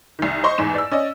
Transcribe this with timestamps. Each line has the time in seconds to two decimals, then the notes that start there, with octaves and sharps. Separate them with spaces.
0.19 C2 D#3
0.44 C5 D#5 C6 C#6
0.58 A1 E2 G#2 E7
0.75 D5 E6
0.91 C#4 D5 D#5